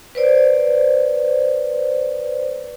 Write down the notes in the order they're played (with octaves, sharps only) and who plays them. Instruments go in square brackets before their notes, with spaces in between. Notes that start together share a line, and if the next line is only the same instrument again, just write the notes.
[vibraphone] B4 C5 D5